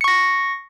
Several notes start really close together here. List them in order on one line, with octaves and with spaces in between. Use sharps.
C#7 C#6 A#6